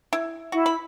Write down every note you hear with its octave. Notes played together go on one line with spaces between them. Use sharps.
E4
E4 F#4
B5